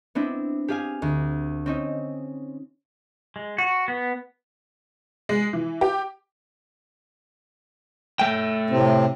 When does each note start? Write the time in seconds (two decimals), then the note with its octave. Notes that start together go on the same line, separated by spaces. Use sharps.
0.15 B3 C4 D4 E4
0.68 G4 G#4 F5 G#5
1.02 D2
1.66 C4 C#4 D#4
3.36 G#3
3.58 F#4
3.88 B3
5.29 G#3
5.53 E3
5.81 G4
8.19 A3 G5
8.70 A2 C3 C4